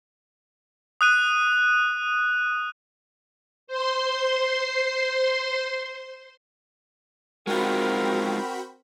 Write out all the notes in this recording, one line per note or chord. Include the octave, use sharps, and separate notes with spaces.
D#6 F#6 D#7
C5 C6
G#3 C4 D#4 F4 F#4 A#4 G5 B5